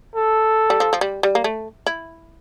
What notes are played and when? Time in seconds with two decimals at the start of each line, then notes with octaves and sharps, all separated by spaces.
0.15 A4
0.70 G3
0.80 F3
0.93 F3
1.01 G3
1.23 G3
1.35 A#3
1.44 A3
1.86 E4